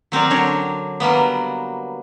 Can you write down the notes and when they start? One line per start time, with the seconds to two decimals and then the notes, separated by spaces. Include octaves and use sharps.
0.12 F#3 C4 A#4 D5
0.30 D3 F#3 D4 C#5
1.00 F#3 G3 A#3 B3